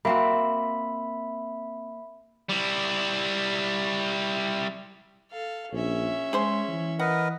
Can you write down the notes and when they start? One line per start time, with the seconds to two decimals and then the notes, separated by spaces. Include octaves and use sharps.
0.05 A#3 C4 F#4 E5 B5
2.50 G3 E4
5.31 A4 F5
5.72 A#1 C#4 E5
6.33 G#3 G#4 C5 C6
6.68 E3
6.99 A#4 B4 D#5 F#5